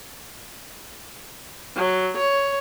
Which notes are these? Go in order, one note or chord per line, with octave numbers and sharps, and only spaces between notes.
F#3
C#5